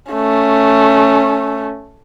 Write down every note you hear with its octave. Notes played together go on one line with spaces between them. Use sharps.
A3 C#4